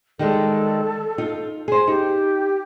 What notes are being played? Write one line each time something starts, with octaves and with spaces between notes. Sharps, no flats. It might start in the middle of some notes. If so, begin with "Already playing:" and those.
D#3 G3 G#3 A4
D#4 F4
G#4 C5
D#4 G4